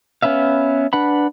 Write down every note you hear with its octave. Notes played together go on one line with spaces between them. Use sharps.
B3 C#4 B4 E5 F5
D4 B4 F#5 B5